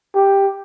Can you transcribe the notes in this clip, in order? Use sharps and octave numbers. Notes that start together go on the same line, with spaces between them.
G4